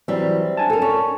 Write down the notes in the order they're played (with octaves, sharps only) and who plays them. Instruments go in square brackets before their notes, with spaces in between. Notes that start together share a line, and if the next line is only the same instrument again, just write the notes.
[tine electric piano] E3 F#3 [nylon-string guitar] G3 C4 E5
[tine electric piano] D4 G#5 A5
[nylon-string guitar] A4 A#4
C#4